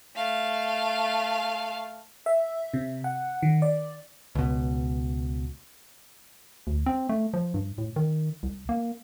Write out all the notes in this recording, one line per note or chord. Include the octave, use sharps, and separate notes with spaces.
A3 F5
E5
C3
F#5
D#3
D5
C#2 B2
D2
C4
A3
F3
G2
A2
D#3
C2
A#3